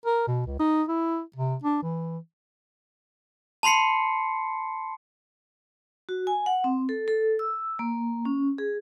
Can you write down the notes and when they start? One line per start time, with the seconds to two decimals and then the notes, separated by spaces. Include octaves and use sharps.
0.06 A#4
0.27 B2
0.46 C#2
0.59 D#4
0.88 E4
1.36 C3
1.63 D4
1.83 E3
3.63 A5 B5 C6 C7 C#7
6.09 F#4
6.27 G#5
6.46 F#5
6.64 C4
6.89 A4
7.08 A4
7.39 E6
7.79 A#3
8.25 C#4
8.58 G#4